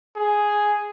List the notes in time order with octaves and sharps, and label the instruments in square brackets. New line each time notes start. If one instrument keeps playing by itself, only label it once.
[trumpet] G#4